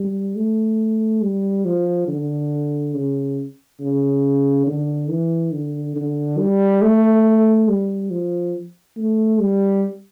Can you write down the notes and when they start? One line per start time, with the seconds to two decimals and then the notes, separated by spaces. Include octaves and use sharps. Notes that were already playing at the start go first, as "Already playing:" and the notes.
Already playing: G3
0.36 A3
1.22 G3
1.65 F3
2.08 D3
2.94 C#3
3.81 C#3
4.67 D3
5.10 E3
5.52 D3
5.95 D3
6.39 G3
6.82 A3
7.68 G3
8.11 F3
8.97 A3
9.40 G3